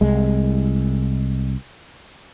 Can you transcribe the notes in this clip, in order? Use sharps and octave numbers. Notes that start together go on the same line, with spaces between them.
C2 G#3